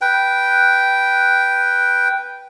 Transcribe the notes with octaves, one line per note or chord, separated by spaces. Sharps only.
B4 G5